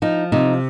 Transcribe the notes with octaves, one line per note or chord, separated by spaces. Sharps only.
F3 D#4
C3 D#4